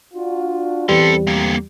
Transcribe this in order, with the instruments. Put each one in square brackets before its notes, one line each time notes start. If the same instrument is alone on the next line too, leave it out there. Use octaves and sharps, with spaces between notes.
[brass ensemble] D4 F4 F#4
[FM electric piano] E2 G3 [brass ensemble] C4 B4 [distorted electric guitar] A4 C6
[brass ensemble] D2 [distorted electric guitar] A#3 C4